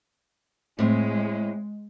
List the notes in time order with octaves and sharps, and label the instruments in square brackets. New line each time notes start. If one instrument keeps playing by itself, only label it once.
[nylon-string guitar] A2 C4 [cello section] G#3